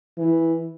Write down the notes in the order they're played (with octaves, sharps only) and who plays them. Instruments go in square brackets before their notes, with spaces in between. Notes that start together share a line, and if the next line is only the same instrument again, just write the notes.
[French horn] E3